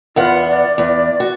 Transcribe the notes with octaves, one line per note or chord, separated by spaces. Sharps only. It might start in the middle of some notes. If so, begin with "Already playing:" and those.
E2 B3 F4 F#5
D5
E2
F#4